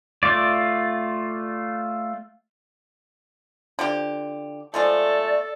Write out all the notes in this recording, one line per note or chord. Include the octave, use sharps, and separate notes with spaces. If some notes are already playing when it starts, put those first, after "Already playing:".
A3 F4 D5
D3 F3 G4
F3 G#3 A3 A4 D5